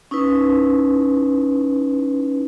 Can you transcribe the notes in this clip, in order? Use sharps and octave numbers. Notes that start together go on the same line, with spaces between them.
C#4 D#4 E4 B4